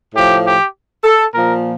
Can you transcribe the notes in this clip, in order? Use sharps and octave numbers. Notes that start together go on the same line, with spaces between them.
A2 F3 G4
G4
A4
A#2 F3 A#4